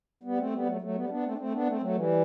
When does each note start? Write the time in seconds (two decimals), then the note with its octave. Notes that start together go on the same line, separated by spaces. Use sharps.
0.23 G3 B3
0.38 A3 C4
0.53 G3 B3
0.66 F#3 A3
0.81 F#3 A3
0.95 G3 B3
1.09 B3 D4
1.23 A3 C4
1.31 D4
1.38 A3 C4
1.52 B3 D4
1.67 A3 C4
1.81 F#3 A3
1.95 E3 G3